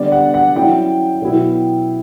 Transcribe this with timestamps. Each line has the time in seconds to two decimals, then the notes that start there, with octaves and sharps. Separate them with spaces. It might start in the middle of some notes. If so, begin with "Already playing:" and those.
Already playing: D3 G3 B3 D5
0.12 F#5
0.34 F#5
0.56 F#3 C#4 E4 G5
1.22 B2 F#3 B3 E4